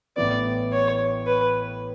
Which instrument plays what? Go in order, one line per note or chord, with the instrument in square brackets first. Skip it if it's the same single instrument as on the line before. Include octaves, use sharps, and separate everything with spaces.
[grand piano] A1 A2 E3 B3 [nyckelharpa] D5
[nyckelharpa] C#5
B4